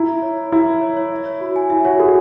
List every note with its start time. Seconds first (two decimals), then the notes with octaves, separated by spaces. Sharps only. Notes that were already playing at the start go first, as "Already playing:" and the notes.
Already playing: E4 A#5
0.09 E5
0.22 C#5
0.37 C#5
0.52 E4 A#5
0.68 E5
0.82 C#5
0.97 C#5
1.12 E5
1.26 C#5
1.41 F#4
1.56 G#5
1.70 E4 E5
1.85 F#4 C#5
1.99 F#4 G#4